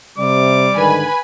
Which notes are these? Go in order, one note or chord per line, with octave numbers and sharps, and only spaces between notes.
C3 G3 D6
G#2 D3 D#3 B4 G#5 B5